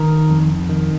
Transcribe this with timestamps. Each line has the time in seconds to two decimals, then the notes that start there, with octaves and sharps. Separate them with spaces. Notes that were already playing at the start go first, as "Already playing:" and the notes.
Already playing: D#3 A#4
0.30 F2
0.69 D#3